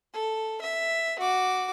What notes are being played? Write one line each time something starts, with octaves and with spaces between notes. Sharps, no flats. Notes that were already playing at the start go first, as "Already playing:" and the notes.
A4
E5
F#4 D6